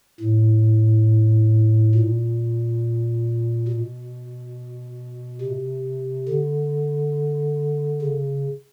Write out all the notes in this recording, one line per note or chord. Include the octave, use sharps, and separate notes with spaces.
A2
A#2
B2
C3
D3
C#3